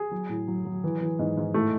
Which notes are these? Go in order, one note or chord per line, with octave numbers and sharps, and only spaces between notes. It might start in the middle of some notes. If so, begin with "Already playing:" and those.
Already playing: G#4
F#3
A2
F#3
F#3
E3
E3
G#2
G#2
A2 A3